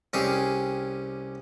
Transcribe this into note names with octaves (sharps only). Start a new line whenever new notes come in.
C2 C#4 G4 G#4